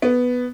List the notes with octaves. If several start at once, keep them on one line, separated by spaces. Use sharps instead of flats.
B3